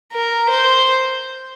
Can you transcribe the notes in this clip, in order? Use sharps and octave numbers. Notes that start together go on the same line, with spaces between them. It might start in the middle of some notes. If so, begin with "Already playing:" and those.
A#4
C5